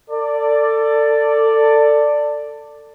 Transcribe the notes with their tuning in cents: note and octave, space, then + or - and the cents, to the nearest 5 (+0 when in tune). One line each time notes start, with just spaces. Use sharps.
A4 +25 D5 +0